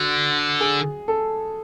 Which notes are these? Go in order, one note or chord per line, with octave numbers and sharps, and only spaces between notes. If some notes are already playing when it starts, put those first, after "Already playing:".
Already playing: D3 F#4
G#4
A4